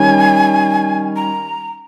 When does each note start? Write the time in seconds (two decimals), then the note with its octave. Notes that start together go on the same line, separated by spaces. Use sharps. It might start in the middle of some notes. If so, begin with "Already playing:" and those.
Already playing: D#3 G3 C#4 G#5
1.16 A#5